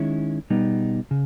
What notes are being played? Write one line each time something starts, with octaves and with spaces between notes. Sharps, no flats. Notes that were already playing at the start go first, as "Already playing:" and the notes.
Already playing: D#3 G#3 C#4 E4
B2 G3 B3 D#4
C#3